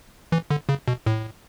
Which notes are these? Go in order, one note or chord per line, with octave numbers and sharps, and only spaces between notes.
E3
D3
C#3
B2
A2